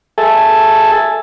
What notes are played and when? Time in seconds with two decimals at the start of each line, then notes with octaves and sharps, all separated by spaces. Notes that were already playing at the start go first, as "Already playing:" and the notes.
0.18 G#4 A4 E5 G#5 A5